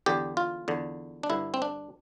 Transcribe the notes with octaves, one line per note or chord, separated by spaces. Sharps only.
E2 D3 G4
F4
E2 D3
D4
G2 D3 E4
C4
D4